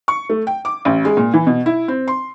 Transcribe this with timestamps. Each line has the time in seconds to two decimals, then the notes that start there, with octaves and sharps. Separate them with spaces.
0.08 C#6
0.30 A3
0.47 G5
0.65 D6
0.85 A1
1.05 G#3
1.17 A#2
1.33 E3
1.47 B2
1.66 E4
1.88 C4
2.08 C6